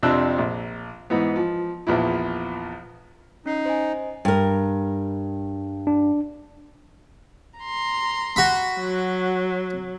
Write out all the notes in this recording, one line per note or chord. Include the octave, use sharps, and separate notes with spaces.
F2 C3 D4 E6 F#6
A#1
G#2 E3 B3
F3
A#1 E2 F3 E4
C#4 D#4 C7
C5 D#5 G#5
G2 A#4
D4
A#5 C6
F#4 B5
F#3